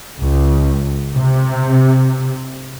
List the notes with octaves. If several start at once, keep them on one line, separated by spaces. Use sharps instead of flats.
C#2
C3